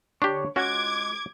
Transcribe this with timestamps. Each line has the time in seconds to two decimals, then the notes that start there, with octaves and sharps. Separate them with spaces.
0.22 D3 D4 G4 C#5 C#6
0.56 G#3 C#4 F4 F#4 D6 F#6 G#6